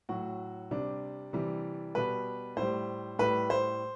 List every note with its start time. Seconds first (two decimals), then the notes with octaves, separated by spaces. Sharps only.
0.09 A2 F#3 F#4
0.71 C3 G3 D4
1.33 C3 E3 G3
1.95 B2 G3 B4
2.57 A2 G3 C5
3.19 A2 G3 B4
3.50 C5